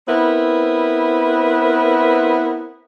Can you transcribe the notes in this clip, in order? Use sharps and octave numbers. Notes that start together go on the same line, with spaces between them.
B3 C4 E4 A#4 B4